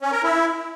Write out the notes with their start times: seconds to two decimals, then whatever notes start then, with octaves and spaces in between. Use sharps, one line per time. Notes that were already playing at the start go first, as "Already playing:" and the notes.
0.01 C#4
0.12 A#4
0.23 E4